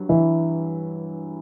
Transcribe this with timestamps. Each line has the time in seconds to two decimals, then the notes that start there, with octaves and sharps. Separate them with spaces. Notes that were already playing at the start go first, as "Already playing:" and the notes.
Already playing: G2 F#3
0.09 E3 E4